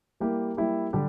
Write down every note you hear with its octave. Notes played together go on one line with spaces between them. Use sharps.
G3 A#3 E4 G4
G3 A#3 E4 G4
D3 G3 D4 G4